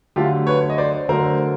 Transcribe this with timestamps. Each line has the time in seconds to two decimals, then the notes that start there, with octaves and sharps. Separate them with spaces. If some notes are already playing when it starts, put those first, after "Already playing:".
0.16 D3 F#3 A3 F4 G4
0.47 B4 C#5
0.70 D#5
0.78 C5 D5
1.09 D3 F#3 A3 A#4 C5